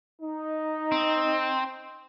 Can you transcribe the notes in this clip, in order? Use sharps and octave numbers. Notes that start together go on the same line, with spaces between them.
D#4
C4